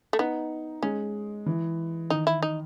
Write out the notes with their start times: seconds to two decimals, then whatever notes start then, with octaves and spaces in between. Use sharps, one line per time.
0.13 A3
0.19 B3 D#4
0.82 G#3 C#4
1.46 E3
2.10 D#3 D#4
2.27 E4
2.42 D#4